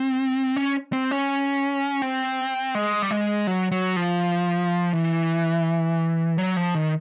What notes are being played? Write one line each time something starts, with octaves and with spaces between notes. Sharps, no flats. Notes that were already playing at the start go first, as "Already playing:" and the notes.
Already playing: C4
C#4
C4
C#4
C4
G#3
G3
G#3
F#3
F#3
F3
E3
F#3
F3
D#3